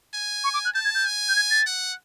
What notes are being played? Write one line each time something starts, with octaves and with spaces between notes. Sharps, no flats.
G#5
C#6
D6
F#6
A5 G6
G#6
G6
G#5
G6
G#6
A6
F#5